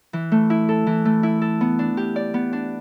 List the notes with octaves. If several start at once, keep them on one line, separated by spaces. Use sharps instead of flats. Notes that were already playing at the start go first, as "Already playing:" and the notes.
E3
A3
E4
A4
E3
A3
E4
A4
B3
D4
G4
D5
B3
D4